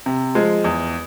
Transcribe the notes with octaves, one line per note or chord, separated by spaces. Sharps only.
C3
F3 G#3
E2